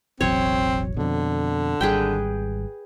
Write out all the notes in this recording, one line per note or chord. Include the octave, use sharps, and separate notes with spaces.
E1 A1 F#3 C4 C#5
F2 B2 D3
G#1 G3 G#4 B4 G5